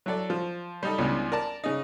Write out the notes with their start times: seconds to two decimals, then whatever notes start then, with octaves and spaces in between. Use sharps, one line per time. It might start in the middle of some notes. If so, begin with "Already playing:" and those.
0.06 F#3 E4 A4 D5
0.30 F3
0.83 G3 D#4 A4
0.98 C#2 B2 E3 G3 D4
1.32 A#4 D5 A5
1.64 C#3 D#4